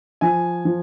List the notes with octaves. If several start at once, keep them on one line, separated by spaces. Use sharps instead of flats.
F3 G#5
F3